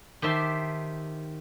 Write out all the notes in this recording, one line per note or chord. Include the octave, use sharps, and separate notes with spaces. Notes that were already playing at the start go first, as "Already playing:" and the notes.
D#3 G4 C5 E5 A5 C6